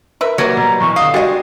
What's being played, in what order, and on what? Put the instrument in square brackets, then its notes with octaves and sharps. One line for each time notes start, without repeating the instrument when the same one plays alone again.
[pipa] A#4 B4 E5
[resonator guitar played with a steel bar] F#3 G3 A#3 [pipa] B4 C#5
[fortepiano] B2 [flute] A#5
[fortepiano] B1 E2 [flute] C#6
[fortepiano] D3 D#5 [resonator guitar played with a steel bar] F5 [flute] D#6
[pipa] G3 D#5 [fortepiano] G#3 D4 [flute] F#4